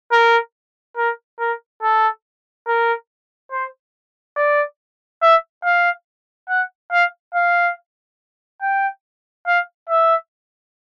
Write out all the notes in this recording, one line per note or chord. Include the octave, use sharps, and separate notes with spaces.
A#4
A#4
A#4
A4
A#4
C5
D5
E5
F5
F#5
F5
F5
G5
F5
E5